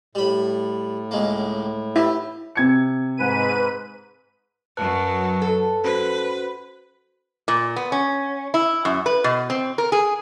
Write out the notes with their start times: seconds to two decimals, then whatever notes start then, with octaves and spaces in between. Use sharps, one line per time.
0.15 A2 G3 B5
1.11 C#2 G#3 A#3
1.96 E4 G4
2.55 C3 G#6 C#7
3.17 G#2 B4 D#7
4.77 F#2 F#3 B4 A5 F#6
5.42 A4
5.84 C#4 F#4 B4 C5
7.48 A#2
7.76 B3
7.92 C#4
8.54 E4
8.85 F#2
9.06 B4
9.24 B2
9.50 C4
9.78 A#4
9.92 G#4